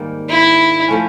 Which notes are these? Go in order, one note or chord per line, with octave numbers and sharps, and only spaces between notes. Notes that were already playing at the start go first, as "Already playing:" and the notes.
Already playing: G#2 D#3 G3 A#3
E4
F3 A3 C#4